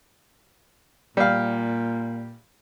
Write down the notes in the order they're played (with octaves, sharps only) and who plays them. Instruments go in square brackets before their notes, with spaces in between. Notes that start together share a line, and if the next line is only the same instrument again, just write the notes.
[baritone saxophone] A#2 [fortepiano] G3 F5